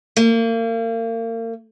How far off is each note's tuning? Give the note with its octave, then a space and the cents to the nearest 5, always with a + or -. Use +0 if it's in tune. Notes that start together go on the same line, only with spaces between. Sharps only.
A#3 -35